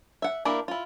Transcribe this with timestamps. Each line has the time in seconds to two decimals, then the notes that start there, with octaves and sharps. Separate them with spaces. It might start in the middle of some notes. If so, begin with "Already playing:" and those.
0.22 E5 F#5
0.45 A#3 D4 E4 G4 A#4
0.68 E4 F4